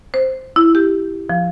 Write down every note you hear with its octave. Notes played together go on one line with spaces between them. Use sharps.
C5
E4
G4
F3